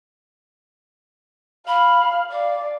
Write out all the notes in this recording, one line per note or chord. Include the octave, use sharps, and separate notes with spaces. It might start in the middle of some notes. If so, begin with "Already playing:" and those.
F5 B5
D5 F5